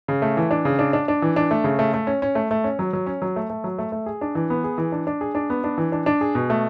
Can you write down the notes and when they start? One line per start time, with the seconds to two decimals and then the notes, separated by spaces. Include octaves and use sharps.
0.08 C#3
0.22 A3
0.37 E3
0.51 D4
0.65 C#3
0.79 D4
0.93 D4
1.08 D4
1.22 E3
1.36 D4
1.51 A3
1.64 C#3
1.79 A3
1.94 A3
2.07 C#4
2.22 C#4
2.35 A3
2.51 A3
2.64 C#4
2.79 F#3
2.93 F#3
3.07 C#4
3.22 F#3
3.36 A3
3.50 A3
3.64 F#3
3.78 A3
3.92 A3
4.06 G#4
4.21 D4
4.35 E3
4.50 B3
4.64 G#4
4.78 E3
4.92 D4
5.07 D4
5.21 G#4
5.35 D4
5.50 B3
5.64 D4
5.78 E3
5.92 D4
6.06 D4
6.21 G#4
6.35 B2
6.50 A3